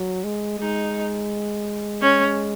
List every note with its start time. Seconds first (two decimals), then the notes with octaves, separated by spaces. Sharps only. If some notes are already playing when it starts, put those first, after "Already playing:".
Already playing: F#3
0.24 G#3
0.59 G#3 D#4
2.01 C#4